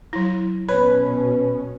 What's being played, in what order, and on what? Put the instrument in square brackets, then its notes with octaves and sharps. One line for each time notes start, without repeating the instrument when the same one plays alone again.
[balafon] F#3 E4
[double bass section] B2 C#4 [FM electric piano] B4 [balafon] C#5